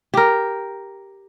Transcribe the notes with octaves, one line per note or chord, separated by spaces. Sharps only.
G4 A#4